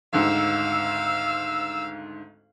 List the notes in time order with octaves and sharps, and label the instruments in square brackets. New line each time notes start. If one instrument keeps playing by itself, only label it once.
[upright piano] G#1 D2 G#2 [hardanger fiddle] F5 [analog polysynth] E6